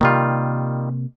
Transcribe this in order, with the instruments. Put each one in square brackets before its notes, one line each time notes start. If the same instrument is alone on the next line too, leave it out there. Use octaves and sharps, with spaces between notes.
[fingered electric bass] C3 A#3 [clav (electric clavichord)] D#3 G3 F4